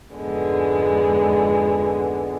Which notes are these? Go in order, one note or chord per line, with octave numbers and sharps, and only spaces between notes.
F2 G#2 D3 G#3 B3